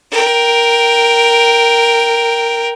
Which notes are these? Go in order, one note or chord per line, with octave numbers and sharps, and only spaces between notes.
A#4 G5